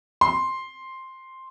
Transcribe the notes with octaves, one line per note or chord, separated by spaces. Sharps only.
C6